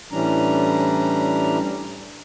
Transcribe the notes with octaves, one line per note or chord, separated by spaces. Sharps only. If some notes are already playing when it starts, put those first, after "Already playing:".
A2 E3 G3 C#4 D4 A#5